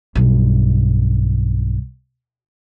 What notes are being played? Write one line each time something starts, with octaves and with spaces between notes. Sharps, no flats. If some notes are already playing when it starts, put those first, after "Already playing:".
B1 G2